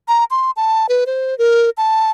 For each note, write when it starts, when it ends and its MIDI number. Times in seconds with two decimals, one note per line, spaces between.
0.08 0.24 82
0.31 0.51 84
0.57 0.87 81
0.89 1.04 71
1.07 1.37 72
1.38 1.70 70
1.78 2.11 81